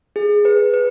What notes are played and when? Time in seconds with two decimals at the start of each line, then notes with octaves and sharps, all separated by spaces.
0.16 G#4
0.45 B4
0.74 B4